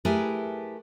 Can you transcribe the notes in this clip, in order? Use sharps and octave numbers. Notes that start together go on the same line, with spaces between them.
A3 E4 G4 G#4 A#4 B4